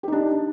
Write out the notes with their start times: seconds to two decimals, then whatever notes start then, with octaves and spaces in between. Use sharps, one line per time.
0.03 G4
0.08 D#4
0.12 D4